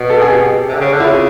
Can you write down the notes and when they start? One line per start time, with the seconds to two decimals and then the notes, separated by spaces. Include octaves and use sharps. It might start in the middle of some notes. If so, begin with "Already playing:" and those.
Already playing: B2
0.10 A4
0.22 G#4
0.33 G4
0.68 C3
0.75 D3
0.80 C#3
0.93 D3
1.00 E4
1.04 C#3 F4